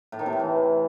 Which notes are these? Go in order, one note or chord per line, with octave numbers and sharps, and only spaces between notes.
A2
D#3
C3
A2
E3